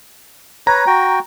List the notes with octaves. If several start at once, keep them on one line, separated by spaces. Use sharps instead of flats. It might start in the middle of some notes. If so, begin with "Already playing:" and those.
B4 C#5 A#5
F#4 G5